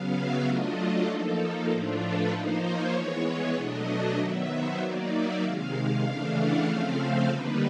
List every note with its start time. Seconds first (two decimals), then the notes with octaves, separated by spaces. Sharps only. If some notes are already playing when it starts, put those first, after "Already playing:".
Already playing: C#3 F#3 B3 F5
0.13 E5
0.44 F#3 A3 D4 F4 D#5
0.76 A4
1.06 F3 A#3 D#4 A4
1.68 A2 F3 A3 D4 F4
2.00 B4
2.31 F3 A#3 D#4 C5
2.62 C#5
2.92 E3 G#3 B3
3.54 B2 F#3 A3 D4 D#5
4.17 D#3 F#3 B3 E5
4.48 C5
4.79 F#3 A#3 D#4 D5
5.09 E5
5.41 C3 D#3 G#3 F5
5.71 F5
6.03 C#3 E3 A3 D4 F5
6.35 F#5
6.65 C#3 F3 A3 C4 F5
6.97 C5
7.27 D3 G3 A#3 D#4 B4